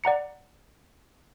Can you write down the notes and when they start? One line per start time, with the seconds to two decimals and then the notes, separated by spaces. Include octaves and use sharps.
0.04 D5 F#5 A#5 C#7